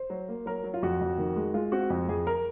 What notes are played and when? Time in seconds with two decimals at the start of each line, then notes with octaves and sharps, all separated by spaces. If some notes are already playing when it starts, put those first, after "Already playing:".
Already playing: C5
0.10 F#3
0.29 A#3
0.46 F#3 A#4
0.64 F#3
0.74 F4
0.82 F2 F#4
1.01 F2
1.18 D#3
1.36 G#3
1.54 G#3 F4
1.72 C4 F#4
1.90 F2
2.09 F2 G#4
2.27 A#4